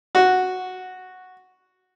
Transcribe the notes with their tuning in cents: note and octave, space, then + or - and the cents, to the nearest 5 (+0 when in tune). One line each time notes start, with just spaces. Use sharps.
F#4 -5